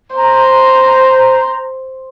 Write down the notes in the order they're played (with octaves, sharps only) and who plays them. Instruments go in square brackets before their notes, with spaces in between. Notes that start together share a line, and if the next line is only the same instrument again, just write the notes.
[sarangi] C5 [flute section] A#5